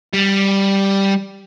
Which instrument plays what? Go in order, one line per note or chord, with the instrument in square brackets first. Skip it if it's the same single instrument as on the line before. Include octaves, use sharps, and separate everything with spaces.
[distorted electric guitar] G3